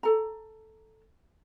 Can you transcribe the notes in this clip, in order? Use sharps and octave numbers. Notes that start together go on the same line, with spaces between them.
A4 A#5